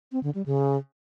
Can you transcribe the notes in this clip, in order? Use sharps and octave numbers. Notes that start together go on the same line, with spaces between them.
C4
D3
G3
C#3